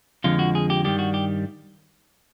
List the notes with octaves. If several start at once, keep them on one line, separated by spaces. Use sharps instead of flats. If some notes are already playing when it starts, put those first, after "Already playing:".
F2 D3 F3 G#3 F4
F#4
G#4
G4
G2 D#3 G3 G4
F#4
G4